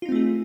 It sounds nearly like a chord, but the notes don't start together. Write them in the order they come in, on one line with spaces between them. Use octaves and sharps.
F4 D#4 C4 A3 G#4